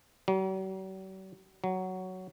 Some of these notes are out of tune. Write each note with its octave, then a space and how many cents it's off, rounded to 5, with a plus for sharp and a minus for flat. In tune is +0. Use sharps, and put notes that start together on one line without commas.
F#3 +45
F#3 +5